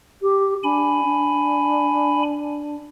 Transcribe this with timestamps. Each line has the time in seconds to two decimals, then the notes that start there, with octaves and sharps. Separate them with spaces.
0.22 G4
0.63 D4 G#5 B5
1.04 D4